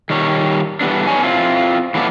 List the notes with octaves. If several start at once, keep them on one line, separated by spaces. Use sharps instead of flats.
D#3 G3 C#5
E3 G3 B3 D4
B3 D#4 C#5 G#5
C4 E4 F4
E3 F#3 A3 B3 D5